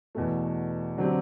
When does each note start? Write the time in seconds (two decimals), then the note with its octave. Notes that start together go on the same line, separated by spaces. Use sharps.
0.15 E2 B2 A3
0.98 D3 F#3 C4 G4